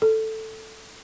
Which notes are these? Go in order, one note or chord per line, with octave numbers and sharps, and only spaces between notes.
A4